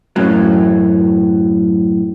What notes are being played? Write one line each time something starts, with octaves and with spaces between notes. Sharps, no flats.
F#2 A2 F#3